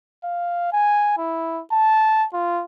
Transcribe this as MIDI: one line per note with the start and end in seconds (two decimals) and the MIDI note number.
0.24 0.70 77
0.73 1.14 80
1.18 1.62 64
1.72 2.25 81
2.34 2.63 65